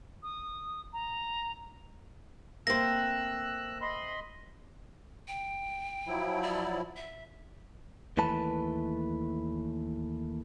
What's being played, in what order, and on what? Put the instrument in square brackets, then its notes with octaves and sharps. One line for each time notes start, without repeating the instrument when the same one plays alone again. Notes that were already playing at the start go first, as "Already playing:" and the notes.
[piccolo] D#6
A#5
[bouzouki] A3 C4 [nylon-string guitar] A#3 C5 [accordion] E6 F#6 [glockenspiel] A#6
[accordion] D#5 B5 C6
[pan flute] G5
[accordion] F3 F#3 E4
[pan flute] D5
E5
[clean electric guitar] D#2 E3 A3 B4 A5